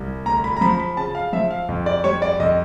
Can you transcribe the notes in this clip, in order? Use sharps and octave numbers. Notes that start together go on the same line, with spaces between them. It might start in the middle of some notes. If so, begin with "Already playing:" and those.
Already playing: C2
D2 A#5
B5
A#5
F3 B5
B5
C#3 A5
F5
F3 E5
F5
F2
D5
G3 C#5
D5
F2 D#5